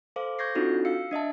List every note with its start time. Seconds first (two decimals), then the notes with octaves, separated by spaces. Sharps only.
0.16 A4 C5 F5 D6
0.39 C#6 G6 G#6 A#6 C7
0.55 C4 D4 D#4 F4 F#4 A4
0.85 F5 E6 C7 C#7
1.11 D4 D#5 E5 A5